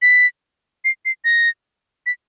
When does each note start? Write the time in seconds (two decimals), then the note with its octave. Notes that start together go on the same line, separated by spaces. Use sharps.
0.02 B6
0.85 C7
1.05 C7
1.25 A#6
2.06 B6